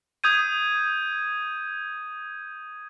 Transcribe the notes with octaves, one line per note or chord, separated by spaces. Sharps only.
D#6 G6 G#6 D#7